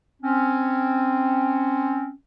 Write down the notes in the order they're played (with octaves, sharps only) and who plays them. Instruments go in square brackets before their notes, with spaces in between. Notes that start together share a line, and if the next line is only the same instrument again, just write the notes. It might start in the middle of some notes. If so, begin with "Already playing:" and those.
[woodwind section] C4 C#4